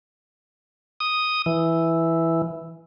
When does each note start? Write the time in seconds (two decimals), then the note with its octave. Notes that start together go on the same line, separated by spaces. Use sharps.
1.00 D#6
1.46 E3